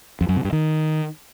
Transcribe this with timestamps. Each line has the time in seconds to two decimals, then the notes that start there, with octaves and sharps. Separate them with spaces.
0.21 F2
0.29 F#2
0.37 C3
0.45 G2
0.52 D#3